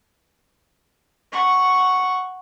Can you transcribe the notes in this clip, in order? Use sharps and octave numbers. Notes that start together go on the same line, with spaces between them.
F#5 C#6